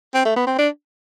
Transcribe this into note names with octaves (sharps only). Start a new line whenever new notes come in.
C4
A3
B3
C4
D4